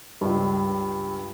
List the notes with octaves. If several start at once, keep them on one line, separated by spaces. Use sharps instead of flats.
C#2 G2